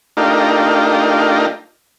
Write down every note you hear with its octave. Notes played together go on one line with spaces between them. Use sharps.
A3 D4 D#4 F4 G4 A#4